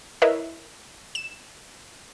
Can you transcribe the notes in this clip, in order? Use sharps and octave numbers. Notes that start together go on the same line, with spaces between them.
E4 A#4 B4 C#5 D#5 E5
E7